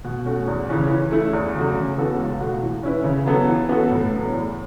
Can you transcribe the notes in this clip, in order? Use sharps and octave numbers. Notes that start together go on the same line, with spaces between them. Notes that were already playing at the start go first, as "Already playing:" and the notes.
B2
A3 C#4 F#4
E2
C#3 E3 C#4
E3
A3 E4
E2
C#3 F#3 A3 F#4
C#3
E3 B3 F#4 A4
C#2
B2 A3 F#4
E3
C#4 E4 B4
C#3
F#3 B3 A4
E3
B3 F#4 A4
A2
F#3 B3
E2